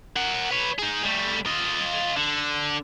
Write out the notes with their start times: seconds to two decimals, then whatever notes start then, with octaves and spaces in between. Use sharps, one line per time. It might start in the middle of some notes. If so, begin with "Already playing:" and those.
0.16 A#4 F#5
0.51 B4 C#5
0.79 D#4 G#4
1.04 G3 A3
1.46 F4 D#5
2.16 D3